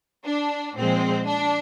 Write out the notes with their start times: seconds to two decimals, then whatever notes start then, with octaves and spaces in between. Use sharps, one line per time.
0.25 D4
0.76 A#2 F3 G#3 C4
1.26 D4